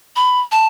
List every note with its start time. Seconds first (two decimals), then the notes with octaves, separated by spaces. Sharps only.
0.16 B5
0.52 A5